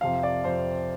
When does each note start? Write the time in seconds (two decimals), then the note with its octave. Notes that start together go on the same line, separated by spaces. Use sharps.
0.01 F2 C3 F3 F5
0.23 D5
0.44 F2 C3 F3 C5